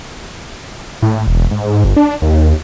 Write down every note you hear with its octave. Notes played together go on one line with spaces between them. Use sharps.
A2
E1
G#2
G1
D4
D#2